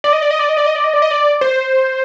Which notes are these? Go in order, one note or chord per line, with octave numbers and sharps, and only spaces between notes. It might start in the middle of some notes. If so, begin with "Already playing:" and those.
D5
D#5
D5
D#5
D5
D#5
D5
D#5
D5
D#5
D5
D#5
D5
C5